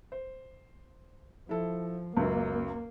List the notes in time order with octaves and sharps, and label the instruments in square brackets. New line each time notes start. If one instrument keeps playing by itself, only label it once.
[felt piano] C5
[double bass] F3 [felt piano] E4 A4
[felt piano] C#2 F#2 [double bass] A#3